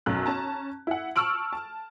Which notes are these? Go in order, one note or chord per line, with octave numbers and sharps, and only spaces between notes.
B1 F#2 F#6
C#4 A5 A#5
E4 F#5
A5 C#6 E6 F6 D7 F#7
A5